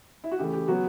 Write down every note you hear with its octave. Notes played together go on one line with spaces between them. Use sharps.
E4
F#4
C#3 E3 A3 G4
G4
C#3 F#3 B3 F#4